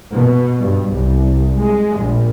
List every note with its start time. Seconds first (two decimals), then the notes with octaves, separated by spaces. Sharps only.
0.14 B2
0.60 G2
0.93 C2
1.58 G#3
1.98 A#1